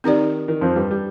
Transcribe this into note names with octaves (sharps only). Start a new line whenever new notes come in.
D#3 C4 D#4 G4 D5
D#3
F2 F3
G2 G3
G3